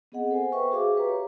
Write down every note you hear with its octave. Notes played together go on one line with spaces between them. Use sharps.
B3 C4 G#4 D#5 F#5
A4 C5 G#5
B4 C5 E5 G5 C#6
F#4 G#4 E5 F5 D6
G4 B4 A#5
C#5